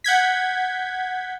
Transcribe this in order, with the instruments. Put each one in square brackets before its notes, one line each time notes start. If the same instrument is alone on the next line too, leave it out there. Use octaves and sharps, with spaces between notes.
[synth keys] F#5 G6 G#6 B6